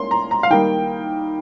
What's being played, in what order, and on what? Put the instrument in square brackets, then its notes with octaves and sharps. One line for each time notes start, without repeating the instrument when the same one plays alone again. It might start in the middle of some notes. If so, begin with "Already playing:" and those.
Already playing: [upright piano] A#3 C#4 C6
A#5
A#5
F5
D#3 G3 A#3 D#4 G5